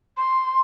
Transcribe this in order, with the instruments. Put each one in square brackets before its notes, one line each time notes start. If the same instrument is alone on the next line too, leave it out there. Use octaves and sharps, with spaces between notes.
[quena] C6